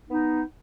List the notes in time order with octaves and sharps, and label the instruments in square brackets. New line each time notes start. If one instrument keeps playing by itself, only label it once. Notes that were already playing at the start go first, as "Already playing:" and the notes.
[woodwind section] B3 D#4